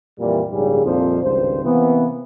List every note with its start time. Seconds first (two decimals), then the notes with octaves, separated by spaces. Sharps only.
0.19 F2 A#2 E3 G3
0.51 A#1 G#2 C#3 G3 G#4
0.85 C2 F2 A#2 F3 C5
1.22 G#1 C#2 G2 C5
1.64 C3 E3 A#3 B3